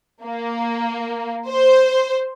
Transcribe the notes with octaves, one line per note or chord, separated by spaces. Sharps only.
A#3
C5